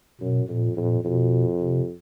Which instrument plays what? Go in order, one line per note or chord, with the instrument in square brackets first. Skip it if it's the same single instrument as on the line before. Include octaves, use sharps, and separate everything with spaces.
[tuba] F#2 [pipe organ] B2
[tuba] F2 [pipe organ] A#2
[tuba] F2 [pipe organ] A#2
[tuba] F2 [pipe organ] B2
[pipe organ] C3